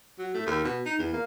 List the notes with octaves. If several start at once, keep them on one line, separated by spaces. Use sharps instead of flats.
F#3
A3
D#2
B2
D#4
E2
A#3